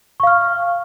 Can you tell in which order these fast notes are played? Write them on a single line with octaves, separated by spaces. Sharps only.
C#6 F5 F6